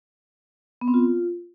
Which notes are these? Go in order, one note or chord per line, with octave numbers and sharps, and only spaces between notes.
B3
C4
F4